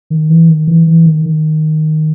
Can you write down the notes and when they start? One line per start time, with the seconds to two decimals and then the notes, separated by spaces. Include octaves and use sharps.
0.10 D#3
0.30 E3
0.49 D#3
0.68 E3
0.87 E3
1.06 D#3
1.25 D#3